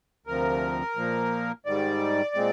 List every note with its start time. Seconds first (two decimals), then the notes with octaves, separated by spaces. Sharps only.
0.26 D2 C3 F3 A#4
0.96 A#2 F3 A#3
1.66 G#2 D#3 G3 D5
2.35 A#2 G#3 C4